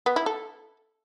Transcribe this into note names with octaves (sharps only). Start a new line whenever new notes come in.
B3
E4
A4